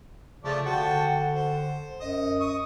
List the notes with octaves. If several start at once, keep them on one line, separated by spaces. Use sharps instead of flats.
C#3 F3 A3 D5
D3 F#4 G5 A5
C5
F#2 D#5
C#6 D#6